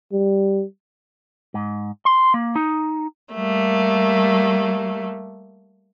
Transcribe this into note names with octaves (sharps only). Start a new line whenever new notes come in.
G3
G#2
C6
A#3
D#4
G3 A3 A#3